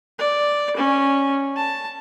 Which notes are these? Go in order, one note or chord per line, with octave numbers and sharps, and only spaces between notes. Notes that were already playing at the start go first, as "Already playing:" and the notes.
D5
C#4
A5